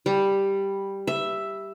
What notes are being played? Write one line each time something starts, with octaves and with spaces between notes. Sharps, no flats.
G3
E5